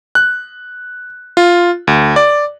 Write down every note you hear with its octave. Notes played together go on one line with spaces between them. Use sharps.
F#6
F4
D2
D5